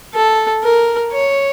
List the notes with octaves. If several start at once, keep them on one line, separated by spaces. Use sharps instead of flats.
A4
A#4
C#5